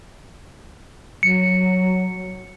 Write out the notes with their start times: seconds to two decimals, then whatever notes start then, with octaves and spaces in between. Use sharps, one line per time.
1.23 F#3 C#7